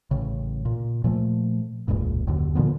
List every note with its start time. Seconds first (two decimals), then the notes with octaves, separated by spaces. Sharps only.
0.11 A1 C#3
0.65 A#2
1.04 A#2 F3 A3
1.88 E1 C#2 G2 A#2
2.27 F#1 D#2 D3
2.55 A#2 D3 F3 B3